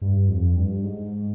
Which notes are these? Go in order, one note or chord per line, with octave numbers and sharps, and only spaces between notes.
G2
F2
G2
G#2